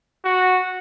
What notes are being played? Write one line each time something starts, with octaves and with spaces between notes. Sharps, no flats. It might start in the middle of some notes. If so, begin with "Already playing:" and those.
F#4